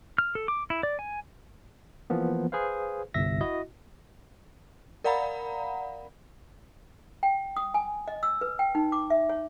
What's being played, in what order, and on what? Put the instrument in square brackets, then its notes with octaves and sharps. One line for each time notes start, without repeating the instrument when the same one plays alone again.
[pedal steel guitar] F6
A4
D6
E4
D5
G#5
[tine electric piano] E3 F3 A#3 B3
G#4 B4 C5 F5
G1 C2 E5 A#6
E4 F#4 D#5
[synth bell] A#4 D5 F5 F#5 A#5 B5
[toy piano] G5
D#6
G#5
D#5
E6
B4
G5
D#4
D6
E5
C#5